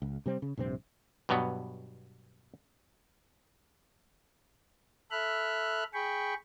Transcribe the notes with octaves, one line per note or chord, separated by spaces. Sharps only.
C#2
C3 G3 C4
C#3
A#1 G2 C3 C4
G2 B2 F#3 B3
A4 E5 B5 F6 F#6
G#4 G5 B5 C#6